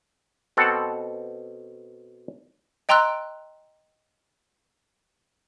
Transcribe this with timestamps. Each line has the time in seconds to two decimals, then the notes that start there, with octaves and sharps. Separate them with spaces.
0.57 B2 C4 A4 F#5
2.89 D#5 G5 A#5 C6 E6 F#6